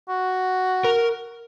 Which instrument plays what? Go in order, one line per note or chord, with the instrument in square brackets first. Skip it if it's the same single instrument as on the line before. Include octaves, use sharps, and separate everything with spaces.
[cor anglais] F#4
[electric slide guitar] A#4